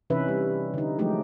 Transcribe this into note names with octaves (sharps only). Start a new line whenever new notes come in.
C3 E3 C#4 D#4 B4 E5
G3
D3 D#4
F3 F#3 G#3 A3 D#4 G4